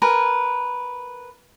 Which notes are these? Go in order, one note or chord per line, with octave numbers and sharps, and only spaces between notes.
A#4 B4 G#5